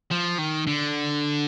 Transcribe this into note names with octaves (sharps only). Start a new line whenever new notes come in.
F3
D#3
D3